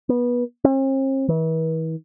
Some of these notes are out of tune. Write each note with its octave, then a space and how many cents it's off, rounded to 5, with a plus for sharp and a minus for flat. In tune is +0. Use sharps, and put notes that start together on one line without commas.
B3 -20
C4 +45
E3 -40